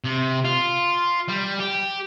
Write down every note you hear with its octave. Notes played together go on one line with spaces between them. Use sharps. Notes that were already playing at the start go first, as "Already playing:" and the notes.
C3
F4
G3
G4